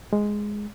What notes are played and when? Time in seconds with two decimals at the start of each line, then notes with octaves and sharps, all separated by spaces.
0.13 G#3